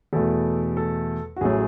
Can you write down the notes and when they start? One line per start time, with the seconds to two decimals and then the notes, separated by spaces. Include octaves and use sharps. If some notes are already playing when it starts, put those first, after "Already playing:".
0.13 E2 B2 A3 A4
0.77 A4
1.36 F#4
1.41 A1 A2 F#3 A3 G#4